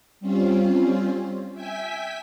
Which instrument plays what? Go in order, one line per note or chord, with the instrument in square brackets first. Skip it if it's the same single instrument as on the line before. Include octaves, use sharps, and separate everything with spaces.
[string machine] G3 C4 C#4 F4
E5 G5 G#5 B6